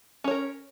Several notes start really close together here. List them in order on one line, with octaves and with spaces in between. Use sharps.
C#4 C#5 A#4